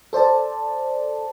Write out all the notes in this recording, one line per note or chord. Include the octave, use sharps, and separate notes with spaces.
A4 C5 D5 A5